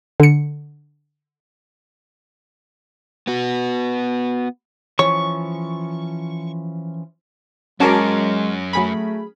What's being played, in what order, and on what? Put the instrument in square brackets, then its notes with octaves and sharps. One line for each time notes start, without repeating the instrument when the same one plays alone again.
[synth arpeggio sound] D3 C#7
[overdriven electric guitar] B3 F#4
[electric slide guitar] E3 F3 C#4 [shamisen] C#5 [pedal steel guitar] C#6
[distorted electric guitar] F#2 [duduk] G#3 [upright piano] C#4 A#4 [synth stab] F#4 A5 D6
[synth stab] F#3 G#4 B5 [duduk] A3